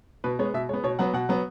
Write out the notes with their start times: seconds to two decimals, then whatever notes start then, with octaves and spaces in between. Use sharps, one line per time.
0.24 B2 B4
0.39 G#3 B3 C#5
0.54 B2 E5
0.69 G#3 C#5
0.73 B3
0.84 B2 C#5
0.99 F#3 B3 F#5
1.13 B2 F#5
1.29 F#3 B3